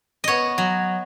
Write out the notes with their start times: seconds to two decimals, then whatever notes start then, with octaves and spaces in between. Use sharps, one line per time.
0.24 B3 C#5 D#5
0.58 F#3